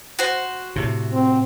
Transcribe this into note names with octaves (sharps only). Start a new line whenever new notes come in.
F#4 C5
A2 C3
C4